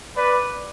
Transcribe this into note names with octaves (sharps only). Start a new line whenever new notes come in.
B4 D5